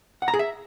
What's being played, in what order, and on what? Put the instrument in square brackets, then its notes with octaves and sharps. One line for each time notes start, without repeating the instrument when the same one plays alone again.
[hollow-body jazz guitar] F#5
A#5
G#4
E5